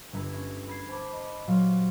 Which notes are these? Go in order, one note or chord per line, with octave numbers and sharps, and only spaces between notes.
G1 B4 E5 A#5 G#6 A#6
C#4
B5 G#6 C7
C5 A5 B5 D6
D#5 B5 D6
A#2 F#3 G3 C5 F5 C6